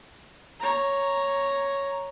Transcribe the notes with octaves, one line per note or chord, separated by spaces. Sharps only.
C#5 A#5